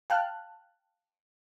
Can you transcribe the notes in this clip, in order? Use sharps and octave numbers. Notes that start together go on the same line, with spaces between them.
F5 G5 A5 F6 F#6